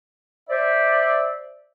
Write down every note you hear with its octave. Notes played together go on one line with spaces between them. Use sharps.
C5 D5 E5